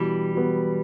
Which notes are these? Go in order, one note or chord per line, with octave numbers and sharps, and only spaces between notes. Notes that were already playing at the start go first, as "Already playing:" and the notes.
Already playing: B2 E3 G3
F#3 B3